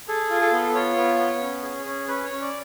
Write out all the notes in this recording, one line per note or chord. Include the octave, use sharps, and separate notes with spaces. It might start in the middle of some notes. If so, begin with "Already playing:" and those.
G#4 A4
F4
A4
B3
F4 C#5
B3
B3
C#4
G#4
C#4
C#4 B4
C#5
C#4
D5